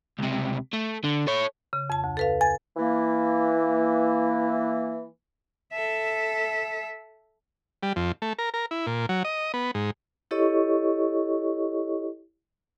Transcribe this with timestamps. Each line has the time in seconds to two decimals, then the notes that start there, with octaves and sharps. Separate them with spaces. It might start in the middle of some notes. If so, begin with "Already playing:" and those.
0.19 C#2 C3
0.73 A3
1.04 D3
1.27 A4 C#5
1.73 C#3
1.90 F2 A5
2.04 D2
2.17 A4 B4 F5
2.41 G#5 A6
2.77 E3 A#3
5.73 A4 E5
7.83 G3
7.96 F2
8.22 A3
8.39 A#4
8.54 A#4
8.71 E4
8.87 A#2
9.09 F#3
9.25 D#5
9.54 B3
9.75 G#2
10.31 E4 G4 A4 C#5 D#5 C#6